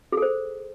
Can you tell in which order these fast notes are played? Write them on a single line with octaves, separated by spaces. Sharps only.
G#4 A4 C5